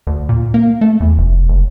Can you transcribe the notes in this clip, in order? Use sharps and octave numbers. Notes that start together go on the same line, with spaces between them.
D2
A#2
A#3
A3
E2
F1
F#1